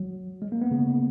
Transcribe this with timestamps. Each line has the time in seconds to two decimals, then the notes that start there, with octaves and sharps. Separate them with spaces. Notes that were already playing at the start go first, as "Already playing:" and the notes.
Already playing: F#3
0.42 G#3
0.52 A#3
0.61 B3
0.71 C#3